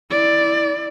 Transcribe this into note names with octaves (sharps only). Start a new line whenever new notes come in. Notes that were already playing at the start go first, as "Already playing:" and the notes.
E4 D5